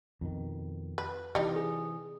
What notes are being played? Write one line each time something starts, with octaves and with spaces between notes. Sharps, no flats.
F2 B2 D#3
B4
C3 E3 G3 D#4
G#4